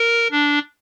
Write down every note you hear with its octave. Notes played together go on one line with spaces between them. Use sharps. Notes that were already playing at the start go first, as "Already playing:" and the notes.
Already playing: A#4
D4